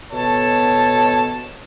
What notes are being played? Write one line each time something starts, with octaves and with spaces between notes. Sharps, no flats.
B2 A4 C#5 A5